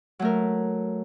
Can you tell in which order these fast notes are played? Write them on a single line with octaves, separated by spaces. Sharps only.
F#3 A3 A#4